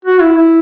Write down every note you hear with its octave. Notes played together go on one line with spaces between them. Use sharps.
F#4
E4
E4